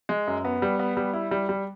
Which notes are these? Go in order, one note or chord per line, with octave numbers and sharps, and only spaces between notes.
G#3
F#2
B3
G3
B3
G3
E4
G3
G3